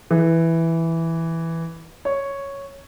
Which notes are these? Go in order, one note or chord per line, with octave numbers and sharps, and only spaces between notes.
E3
C#5